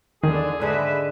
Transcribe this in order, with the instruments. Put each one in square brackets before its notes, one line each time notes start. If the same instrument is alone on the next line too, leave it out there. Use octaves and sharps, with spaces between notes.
[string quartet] E2 D3 [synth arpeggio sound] D#3 [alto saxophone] G#4
[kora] G#2 D3 G#3 [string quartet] B4 E5